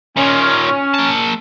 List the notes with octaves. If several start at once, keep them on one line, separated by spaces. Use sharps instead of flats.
A#2 D#3 C#4
A#3 A5